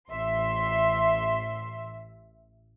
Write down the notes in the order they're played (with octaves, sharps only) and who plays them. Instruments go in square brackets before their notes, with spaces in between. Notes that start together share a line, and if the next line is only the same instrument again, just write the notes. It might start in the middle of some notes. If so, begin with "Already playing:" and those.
[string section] A1 E5 C6